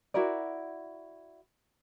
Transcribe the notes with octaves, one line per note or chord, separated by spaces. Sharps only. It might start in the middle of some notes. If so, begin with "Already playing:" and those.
E4 F#4 A#4 D5